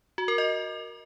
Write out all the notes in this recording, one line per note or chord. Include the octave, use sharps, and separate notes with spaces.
F#4
A#4
D#5